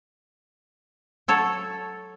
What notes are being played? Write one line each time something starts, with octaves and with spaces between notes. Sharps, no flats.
F#3 A4 C#5